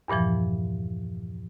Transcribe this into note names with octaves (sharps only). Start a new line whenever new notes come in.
E2 G2 A#2 E3 F3